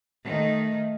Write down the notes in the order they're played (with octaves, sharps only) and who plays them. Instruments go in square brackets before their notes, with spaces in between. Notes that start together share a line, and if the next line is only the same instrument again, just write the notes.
[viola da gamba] D#3 A3 D#4